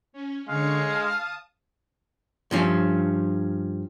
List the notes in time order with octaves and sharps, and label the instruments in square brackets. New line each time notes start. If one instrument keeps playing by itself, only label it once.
[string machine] C#4
[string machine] D3 C#5 C#7 [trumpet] G#3 [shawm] F5
[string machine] A5 D#6
[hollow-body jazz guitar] G2 F3 C#4